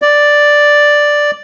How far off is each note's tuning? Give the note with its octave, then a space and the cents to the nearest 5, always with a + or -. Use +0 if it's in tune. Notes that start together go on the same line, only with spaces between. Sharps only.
D5 +0